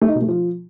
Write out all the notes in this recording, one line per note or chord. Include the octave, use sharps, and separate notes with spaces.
A3
D#4
B2
A3
F3